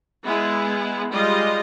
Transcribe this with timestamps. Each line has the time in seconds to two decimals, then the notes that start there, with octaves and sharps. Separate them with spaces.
0.24 G#3 B3 E4 G#4
1.11 G3 G#3 F4 D#5